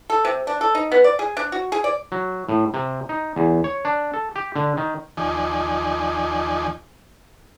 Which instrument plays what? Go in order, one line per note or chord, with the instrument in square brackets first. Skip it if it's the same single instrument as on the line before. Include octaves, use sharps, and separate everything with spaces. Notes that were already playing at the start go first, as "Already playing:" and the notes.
[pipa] A4
C3
D4
A4
D#4
B3
D5
G#4
D4
F#4
G#4
D5
[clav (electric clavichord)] F#3
A2
C3
D#4
E2
C#5
D4
A4
G4
D3
D#3
[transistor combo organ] D#2 F3 D#4 D5 G#5